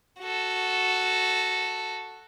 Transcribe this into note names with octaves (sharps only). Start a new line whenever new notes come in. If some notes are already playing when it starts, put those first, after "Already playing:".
F#4 A4